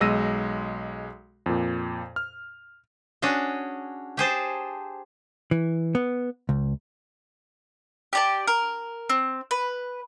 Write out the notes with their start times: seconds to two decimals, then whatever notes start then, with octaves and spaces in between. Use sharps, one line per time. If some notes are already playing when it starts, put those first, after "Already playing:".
0.01 B1 G#3 E6 A#6 D#7
1.46 F2 A#2
2.16 F6
3.22 C#4 D4 F#4 G#4
4.17 G4 G#4 C5 A5
5.51 E3
5.95 B3
6.49 C#2
8.13 G4 D5 A5
8.48 A#4
9.09 C4
9.51 B4